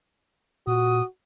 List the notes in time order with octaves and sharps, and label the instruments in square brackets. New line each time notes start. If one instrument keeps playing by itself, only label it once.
[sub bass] A#2 [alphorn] F#4 [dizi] D#6